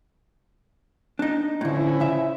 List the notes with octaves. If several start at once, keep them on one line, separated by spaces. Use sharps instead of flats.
D4 D#4
A2 D3 F3 C#4 E4
C#3 E5